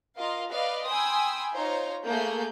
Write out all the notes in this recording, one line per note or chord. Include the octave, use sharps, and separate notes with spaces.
F4 A#4 D#5 F5
B4 D5 D#5 F5
G5 G#5 B5 C6 D#6 E6
D#4 F4 C5 C#5 A#5
A3 A#3 G#4 G6